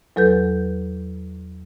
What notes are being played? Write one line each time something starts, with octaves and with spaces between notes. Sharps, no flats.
E2 F#3 A4 B4 G6